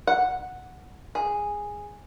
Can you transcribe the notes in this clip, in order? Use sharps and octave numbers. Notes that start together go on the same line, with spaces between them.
F#5
G#4